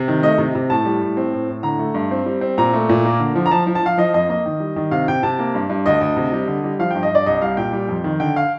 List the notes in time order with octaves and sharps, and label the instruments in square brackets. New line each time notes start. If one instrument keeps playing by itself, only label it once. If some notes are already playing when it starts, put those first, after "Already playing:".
Already playing: [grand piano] C3
D#3
A3 D#5
C3
C3
A2 A5
G3
A2
C4
A2
A2
D3 A#5
A3
G2
C4
G3
C4
A#2 A#5
A3
A#2
A#3
D3
F3
A#5
F3 A5
F3
A5
F3 F5
F3 D#5
F2 D#5
A#3 D#5
D#3
G3
D#3
C3 F5
C3 G5
C3 A5
A#3
G2
G2
D2 D#5
D2
C3
G3
D3
G3
F3 F5
G2 G5
D#5
G2 D5
C2 D#5
G3 F5
A#2 G5
G3
F2
D#3
D3 G5
F5